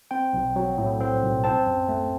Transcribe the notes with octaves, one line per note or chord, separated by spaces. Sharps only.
C4 G5
B1
F#3
A2
C4
B1
C4 A5
F#2
A3